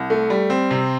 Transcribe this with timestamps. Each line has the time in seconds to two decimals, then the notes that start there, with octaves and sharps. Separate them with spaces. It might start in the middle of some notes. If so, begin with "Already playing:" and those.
Already playing: C2
0.10 A3
0.30 G3
0.50 C4
0.71 C3